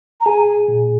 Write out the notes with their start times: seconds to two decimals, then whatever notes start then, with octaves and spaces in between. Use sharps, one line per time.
0.20 A#5
0.26 G#4 G#5
0.68 A#2